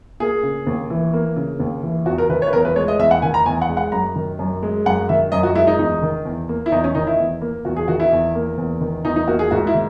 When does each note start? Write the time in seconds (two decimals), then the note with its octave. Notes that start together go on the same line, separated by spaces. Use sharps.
0.20 A#3 G#4
0.43 C#3
0.67 D#2
0.90 E3
1.14 A#3
1.36 C#3
1.60 D#2
1.83 E3
2.06 E2 F#4
2.18 A#4
2.29 D#3 B4
2.42 C#5
2.48 B4
2.53 E2 A#4
2.65 B4
2.76 G#3 C#5
2.88 D#5
2.99 E2 E5
3.11 F#5
3.22 D#3 G#5
3.34 A#5
3.46 E2 G#5
3.62 F#5
3.69 G#3
3.77 F#5
3.92 F#2 A#5
4.16 D#3
4.39 F#2
4.63 G#3
4.86 F#2 F#5
5.09 D#3 E5
5.32 F#2 D#5
5.43 F#4
5.55 G#3 E4
5.67 D#4
5.78 E2 D#4
6.02 D#3
6.25 E2
6.49 A#3
6.66 E4
6.72 E2 D#4
6.84 C#4
6.95 D#3 D#4
7.07 E4
7.19 E2
7.41 A#3
7.65 E2 F#4
7.76 G#4
7.88 D#3 F#4
8.00 E4
8.12 E2
8.35 A#3
8.57 E2
8.81 D#3
9.05 E2 D#4
9.16 D#4
9.28 A#3 F#4
9.39 G#4
9.51 G#2 F#4
9.67 E4
9.74 D#3